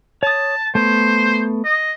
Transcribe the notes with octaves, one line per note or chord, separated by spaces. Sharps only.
C#5 A5 D#6
A3 B3 C5
D#5